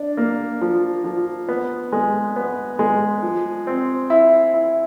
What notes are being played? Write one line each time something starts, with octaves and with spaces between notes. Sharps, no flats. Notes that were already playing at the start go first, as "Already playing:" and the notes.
Already playing: D4
A#3
F3
F3
B3
G#3
B3
G#3
F3
C4
E4
E4